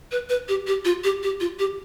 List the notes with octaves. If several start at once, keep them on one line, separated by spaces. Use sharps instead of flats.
B4
B4
G4
G4
F4
G4
G4
F4
G4